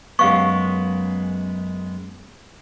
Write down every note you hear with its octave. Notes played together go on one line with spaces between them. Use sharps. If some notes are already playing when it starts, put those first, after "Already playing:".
F#2 G#3 B3 G4 F5 C#6